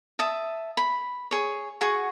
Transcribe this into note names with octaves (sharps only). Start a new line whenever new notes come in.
E5 A5 D#6
B5
G#4 C#5
F#4 G#4 F#5 C#6